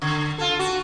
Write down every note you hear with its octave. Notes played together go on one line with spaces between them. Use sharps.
D3
F4 A4
F#4